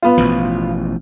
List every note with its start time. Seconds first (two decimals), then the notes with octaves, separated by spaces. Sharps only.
0.02 B3 F4
0.18 A1 B2 F3